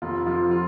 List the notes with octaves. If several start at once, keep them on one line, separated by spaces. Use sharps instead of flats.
F1 F4
F3 F4
F4